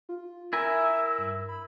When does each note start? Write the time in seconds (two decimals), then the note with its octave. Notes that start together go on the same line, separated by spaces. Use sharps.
0.09 F4
0.53 E4 A#4 E5 G#5 E6
1.18 G2
1.49 B5